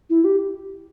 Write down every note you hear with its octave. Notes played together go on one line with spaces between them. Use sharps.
E4
G4